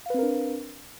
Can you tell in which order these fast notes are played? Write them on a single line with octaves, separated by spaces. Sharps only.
F5 B4 C4 A#4 D4